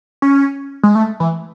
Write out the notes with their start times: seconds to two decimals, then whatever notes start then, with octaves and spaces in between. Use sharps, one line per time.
0.22 C#4
0.83 G#3
0.95 A3
1.20 E3